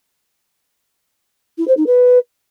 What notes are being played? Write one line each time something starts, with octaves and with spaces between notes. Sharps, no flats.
E4
C5
D#4
B4